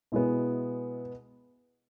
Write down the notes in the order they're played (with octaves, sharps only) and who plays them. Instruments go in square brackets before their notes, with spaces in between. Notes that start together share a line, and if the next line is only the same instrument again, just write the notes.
[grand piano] B2 G#3 B3 E4